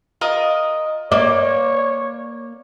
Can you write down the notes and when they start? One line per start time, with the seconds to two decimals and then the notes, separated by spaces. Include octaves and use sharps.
0.21 F4 A#4 D#5
1.12 A#3 C#5 D5